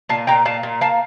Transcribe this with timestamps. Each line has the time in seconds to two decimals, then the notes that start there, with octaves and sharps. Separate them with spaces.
0.09 A#2 F5 A5
0.27 A#2 G5 A#5
0.45 A#2 F5 A5
0.63 A#2
0.81 A#3 F5 A5